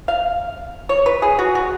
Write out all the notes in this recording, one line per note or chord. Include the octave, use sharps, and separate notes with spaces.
F5
C#5
B4
G#4
F#4
F#4